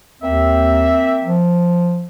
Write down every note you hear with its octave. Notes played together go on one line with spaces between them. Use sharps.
D#2 A#3 C4 E5
F3